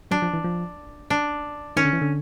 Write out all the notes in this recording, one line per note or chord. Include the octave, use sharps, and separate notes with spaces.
F#3 D4
F3
E3
F3
D4
D#3 C#4
D3
E3
D3